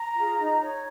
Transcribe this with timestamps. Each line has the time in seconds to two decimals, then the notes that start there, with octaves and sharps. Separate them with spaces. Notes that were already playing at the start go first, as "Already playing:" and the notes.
Already playing: A#5
0.15 F4 G#4
0.38 D#4
0.62 C#5